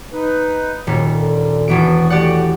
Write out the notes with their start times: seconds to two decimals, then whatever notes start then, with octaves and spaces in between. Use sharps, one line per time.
0.13 D#4 B4
0.87 D#1 F#3
1.10 A#2 D3
1.68 E1 E3 B3 F#4 D7
2.10 A3 F#4 G4 D5 F#5